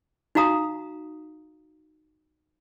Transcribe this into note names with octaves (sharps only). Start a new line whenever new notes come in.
D#4 F#4 F5 A#5 D#6